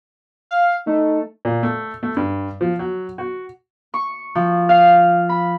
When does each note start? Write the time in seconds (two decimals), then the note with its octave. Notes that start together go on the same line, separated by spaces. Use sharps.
0.51 F5
0.87 A3 D#4
1.45 A#2
1.63 A3
2.03 A3
2.17 G2
2.61 F3
2.79 F#3
3.18 F#4
3.94 C#6
4.35 F3
4.69 F5
5.29 B5